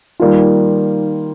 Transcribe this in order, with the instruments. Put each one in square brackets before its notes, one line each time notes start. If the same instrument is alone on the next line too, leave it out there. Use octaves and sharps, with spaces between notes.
[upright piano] D#3 G3 A#3 F4